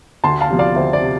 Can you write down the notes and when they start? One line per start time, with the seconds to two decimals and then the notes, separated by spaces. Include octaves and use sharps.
0.24 D2 A5 C6
0.41 F5 A5
0.50 C3 F3
0.59 D5 F5
0.76 D2 C5 E5
0.93 D5
1.02 C3